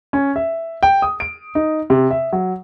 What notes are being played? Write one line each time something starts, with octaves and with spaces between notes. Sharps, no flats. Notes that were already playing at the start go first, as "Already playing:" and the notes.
C#4
E5
G5
D#6
D7
D#4
C3
E5
F#3